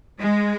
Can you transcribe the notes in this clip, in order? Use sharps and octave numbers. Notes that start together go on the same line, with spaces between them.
G#3